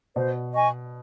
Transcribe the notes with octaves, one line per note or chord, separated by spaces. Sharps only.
B2 C5
D#5 G#5 C#6